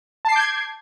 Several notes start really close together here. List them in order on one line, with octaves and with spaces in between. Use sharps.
A5 C7 D6 G6 G#6